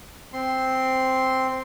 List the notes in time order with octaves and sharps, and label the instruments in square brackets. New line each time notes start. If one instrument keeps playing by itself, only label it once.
[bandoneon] C4 C6